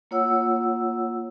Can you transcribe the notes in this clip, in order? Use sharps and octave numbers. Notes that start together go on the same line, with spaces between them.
A#3 F4 C#5 F#5 E6